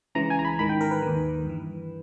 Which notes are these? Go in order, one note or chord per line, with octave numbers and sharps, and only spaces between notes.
C#2 C#3 E3 A#5
G#5
A#5
B5
G#2 D#3 B5
G5
A#4
B4
D#2 D#3
G2 E3